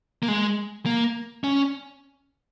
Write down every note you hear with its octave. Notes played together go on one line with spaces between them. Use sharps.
A#3
G#3
A#3
C#4